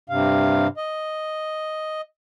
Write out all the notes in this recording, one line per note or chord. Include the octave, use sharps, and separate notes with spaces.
G2 C3 F5
D#5